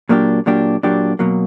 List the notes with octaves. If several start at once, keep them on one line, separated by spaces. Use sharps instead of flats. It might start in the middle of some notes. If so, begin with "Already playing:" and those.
A#2 F#3 A#3 D4 G4
A#2 F#3 A#3 D4 G4
A#2 F#3 A#3 D4 G4
B2 F#3 A#3